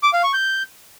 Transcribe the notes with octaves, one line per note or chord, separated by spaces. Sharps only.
D6
F5
C#6
G6